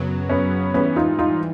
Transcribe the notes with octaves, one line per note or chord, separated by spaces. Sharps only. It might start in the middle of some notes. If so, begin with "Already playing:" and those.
Already playing: F#2 C#3 F#3 B3
B3 C#4
G#2 E3 G3 B3 C#4
D#4 F4
D#4 F4